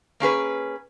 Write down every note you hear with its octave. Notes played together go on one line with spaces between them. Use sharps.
A#3 C#4 G#4 B4